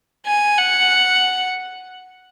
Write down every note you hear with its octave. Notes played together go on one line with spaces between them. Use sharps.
G#5
F#5